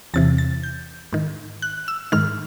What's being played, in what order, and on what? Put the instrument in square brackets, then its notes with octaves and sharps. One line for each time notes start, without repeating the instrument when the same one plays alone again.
[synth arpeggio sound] E2 C3 E3 A6
A6
G6
G#2 D#3
F#6
E6
G#2 D#3 F6